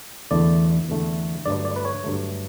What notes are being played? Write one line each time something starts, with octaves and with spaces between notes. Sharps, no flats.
E2 D3 A3 D5
E2 D3 A3
G2 D3 F#3 A3 D5
D5
B4
C#5
G2 D3 F#3 A3